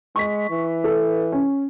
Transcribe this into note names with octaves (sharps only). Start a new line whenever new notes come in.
G#3 C#6 B6
E3
A4 B4
C#4